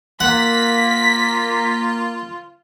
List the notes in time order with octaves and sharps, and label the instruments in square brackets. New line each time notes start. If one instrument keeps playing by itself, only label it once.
[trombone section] A#3 [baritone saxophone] F4 [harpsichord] F#5 [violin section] B6